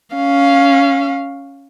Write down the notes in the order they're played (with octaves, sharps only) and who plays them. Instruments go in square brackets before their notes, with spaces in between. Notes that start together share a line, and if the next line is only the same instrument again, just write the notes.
[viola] C#4 F5